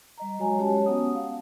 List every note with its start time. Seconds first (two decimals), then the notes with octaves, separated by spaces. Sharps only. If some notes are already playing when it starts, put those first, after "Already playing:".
0.18 G3 D#5 A#5
0.38 F#3 G#3 F#4 C#5 G#5 A#5
0.58 G#3 C#4 F#4 G4 C#5 A5
0.86 B3 C#4 F#5 D#6
1.15 F5